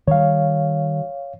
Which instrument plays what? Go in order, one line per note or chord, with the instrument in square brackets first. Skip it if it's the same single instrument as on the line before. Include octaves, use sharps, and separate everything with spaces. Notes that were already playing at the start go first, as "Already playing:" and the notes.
[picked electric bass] D#3 G3 [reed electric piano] C#5 F5